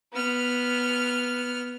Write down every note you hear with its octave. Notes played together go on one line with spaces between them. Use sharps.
B3 F6